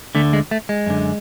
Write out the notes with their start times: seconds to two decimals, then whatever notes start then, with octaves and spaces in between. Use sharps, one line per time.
0.15 D2 D3 A3
0.33 G#3
0.51 A3
0.69 G#3
0.86 F#2 D3